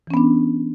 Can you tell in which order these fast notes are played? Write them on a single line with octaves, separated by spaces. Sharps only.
E3 C#4 B3 D4